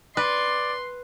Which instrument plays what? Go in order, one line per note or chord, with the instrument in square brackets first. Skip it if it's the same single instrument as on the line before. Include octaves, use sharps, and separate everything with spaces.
[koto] B4 [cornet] D5 [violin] C6